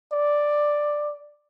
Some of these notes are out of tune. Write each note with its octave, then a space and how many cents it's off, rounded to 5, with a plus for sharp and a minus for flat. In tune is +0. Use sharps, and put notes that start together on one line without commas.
D5 +5